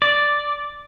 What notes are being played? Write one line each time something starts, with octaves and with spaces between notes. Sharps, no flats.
D5